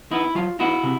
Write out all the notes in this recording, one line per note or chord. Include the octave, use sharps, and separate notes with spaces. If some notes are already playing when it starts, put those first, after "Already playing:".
B3 D#4 E4
F#3 F4
B3 D#4 E4 F#4
C3